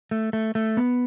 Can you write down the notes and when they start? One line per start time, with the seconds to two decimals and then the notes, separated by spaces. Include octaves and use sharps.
0.11 A3
0.33 A3
0.55 A3
0.77 B3